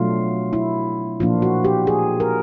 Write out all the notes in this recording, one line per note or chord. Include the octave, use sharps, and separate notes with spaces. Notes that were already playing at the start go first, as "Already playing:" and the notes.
Already playing: B2 F#3 A3 D4 F4
E4
A#2 F3 A#3 D4 F4
F#4
G4
G#4
A#4